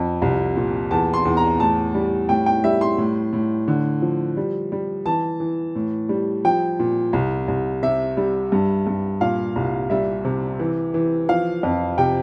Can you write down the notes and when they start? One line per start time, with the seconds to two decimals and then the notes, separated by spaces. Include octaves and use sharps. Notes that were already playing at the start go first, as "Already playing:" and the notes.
Already playing: F2
0.22 C2
0.56 A#2
0.91 E2 A5
1.14 C6
1.25 E2
1.37 A#5
1.60 A2 A5
1.94 G3
2.29 A2 G5
2.46 G5
2.64 G3 E5
2.81 C6
2.98 A2
3.33 A2
3.68 D3
4.02 F3
4.37 G3
4.72 G3
5.06 E3 A5
5.40 E3
5.75 A2
6.09 G3
6.45 F3 G5
6.79 A#2
7.13 C2
7.48 C2
7.83 C3 E5
8.17 G3
8.52 G2
8.87 G2
9.21 A#2 F5
9.56 C2
9.90 G3 E5
10.25 C3
10.59 E3
10.94 E3
11.29 F3 F5
11.63 F2
11.98 C3 G5